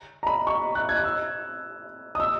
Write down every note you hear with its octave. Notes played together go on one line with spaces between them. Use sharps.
A#5
B5
C#6
F#6
G#6
F#6
E6
D#6
E6